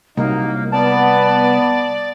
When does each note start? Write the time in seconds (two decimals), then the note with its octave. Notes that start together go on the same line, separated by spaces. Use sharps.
0.17 C2 F#3 A#3 D#4
0.72 B3 D5 A5